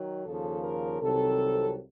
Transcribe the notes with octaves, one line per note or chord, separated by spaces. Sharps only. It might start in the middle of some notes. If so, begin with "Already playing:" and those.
Already playing: D#3 F#3
D#2 C#3 F3 A4
A#4
C2 C3 D#3 F#3 A4